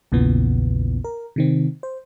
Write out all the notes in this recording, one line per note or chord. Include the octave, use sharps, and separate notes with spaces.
A#1 E2 A#2 C#3 E3 B3
A#4
C3 D#3 C4
C5